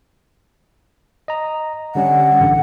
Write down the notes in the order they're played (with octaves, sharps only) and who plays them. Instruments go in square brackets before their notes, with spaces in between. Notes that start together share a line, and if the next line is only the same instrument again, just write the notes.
[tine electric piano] D#5 A#5
[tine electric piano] D3 G3 C#4 [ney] F#5
[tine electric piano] A1 D3